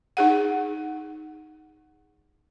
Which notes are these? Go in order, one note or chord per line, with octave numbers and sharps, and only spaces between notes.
D#4 G#4 F#5